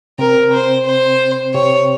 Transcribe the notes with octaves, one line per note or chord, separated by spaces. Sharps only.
C3 C4 A#4
C5
C5
C3 C4 C#5